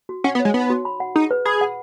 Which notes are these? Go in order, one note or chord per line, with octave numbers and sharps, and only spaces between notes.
F#4
C#4 F#5
B3
C#5
G#3
B3 D#4
F#4
B5
F#5
D#4 G#4
B4
G#4 B5
F#5